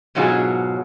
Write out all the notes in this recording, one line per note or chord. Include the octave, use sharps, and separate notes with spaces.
G#2 B2 F#3 B3 F4 G#4